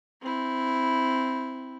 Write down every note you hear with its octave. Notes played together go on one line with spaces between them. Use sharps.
C4 E4